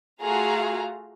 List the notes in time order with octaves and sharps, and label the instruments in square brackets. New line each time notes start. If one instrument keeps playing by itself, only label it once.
[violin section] A3 F4 F#4 G#4 F5 A#5